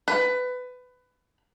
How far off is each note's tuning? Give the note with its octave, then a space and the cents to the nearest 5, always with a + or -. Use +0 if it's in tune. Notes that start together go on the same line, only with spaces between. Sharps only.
B4 +20